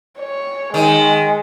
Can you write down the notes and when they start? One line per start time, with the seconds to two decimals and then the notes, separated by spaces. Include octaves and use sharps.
0.19 C#5
0.74 D#3 G#3